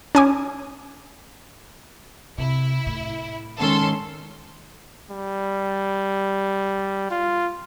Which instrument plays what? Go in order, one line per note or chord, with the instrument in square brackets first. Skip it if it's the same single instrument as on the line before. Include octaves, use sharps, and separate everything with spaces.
[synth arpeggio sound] C#4 G#5 D6
[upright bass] C3 [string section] E4
[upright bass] A2
[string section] G#2 A4 C6 [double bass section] D#3 C#4
[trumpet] G3
F4